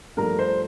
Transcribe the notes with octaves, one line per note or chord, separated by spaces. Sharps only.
G2 F3 A3 A#4 A#5
C5 C6